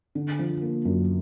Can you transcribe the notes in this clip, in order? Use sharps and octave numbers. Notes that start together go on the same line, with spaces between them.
D3
F3
A#3
F#2